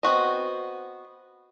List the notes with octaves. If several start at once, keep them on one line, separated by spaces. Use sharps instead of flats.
B3 C4 F#4 D#5